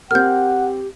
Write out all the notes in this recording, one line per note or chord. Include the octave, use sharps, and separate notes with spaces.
C4 G4 A#4 F#5 F6 G6